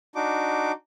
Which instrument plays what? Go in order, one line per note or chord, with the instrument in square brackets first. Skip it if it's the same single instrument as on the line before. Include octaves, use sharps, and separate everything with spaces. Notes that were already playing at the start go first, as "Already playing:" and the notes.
[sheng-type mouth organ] D4 D#4 F#4 D6